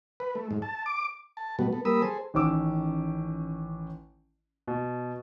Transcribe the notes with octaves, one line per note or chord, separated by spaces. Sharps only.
B4
A3
G#2
A5
D6
A5
B2 G3 A3 B3 F#4
B3 A4
G3 A#3 A#4 B5 D#6 E6
G#4 A4 C5
A1 D#3 C#4 D#4 D6 E6
B2